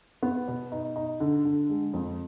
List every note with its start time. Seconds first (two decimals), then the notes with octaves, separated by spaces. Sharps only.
0.23 B3
0.48 B2
0.72 D#4
0.96 D#4
1.20 D3
1.45 D3
1.69 G#3
1.94 F2